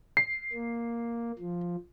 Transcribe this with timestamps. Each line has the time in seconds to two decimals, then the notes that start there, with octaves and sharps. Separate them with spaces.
0.17 C7
0.53 A#3
1.39 F3